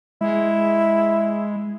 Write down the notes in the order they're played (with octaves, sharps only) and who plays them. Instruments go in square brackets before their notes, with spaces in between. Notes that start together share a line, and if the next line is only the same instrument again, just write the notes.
[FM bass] G#3 [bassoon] E4